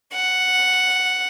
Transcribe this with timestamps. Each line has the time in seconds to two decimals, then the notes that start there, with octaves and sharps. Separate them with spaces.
0.13 F#5